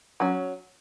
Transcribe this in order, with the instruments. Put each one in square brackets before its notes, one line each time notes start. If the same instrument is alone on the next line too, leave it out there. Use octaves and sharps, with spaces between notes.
[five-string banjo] F#3 C#4